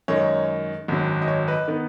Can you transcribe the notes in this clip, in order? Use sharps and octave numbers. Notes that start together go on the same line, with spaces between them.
F#2 D#3 G#3 D#4 C#5
G#1 F#2 F#3
D#5
C#5
B4 D#5
D#3 B3